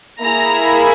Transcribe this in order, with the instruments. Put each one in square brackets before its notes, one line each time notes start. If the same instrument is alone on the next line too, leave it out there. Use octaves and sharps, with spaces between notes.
[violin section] A#3 E4 G#4 A#5